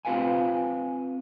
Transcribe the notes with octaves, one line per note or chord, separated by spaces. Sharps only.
C4 F4 B4 F5 G#5